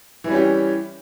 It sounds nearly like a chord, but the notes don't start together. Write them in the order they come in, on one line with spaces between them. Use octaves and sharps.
E3 G3 C#4 G4